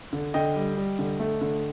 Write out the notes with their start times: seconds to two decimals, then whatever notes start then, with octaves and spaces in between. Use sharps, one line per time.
0.13 D3
0.34 D3 D#5 G5
0.56 G3
0.77 G3
0.99 D3
1.19 A3
1.41 D3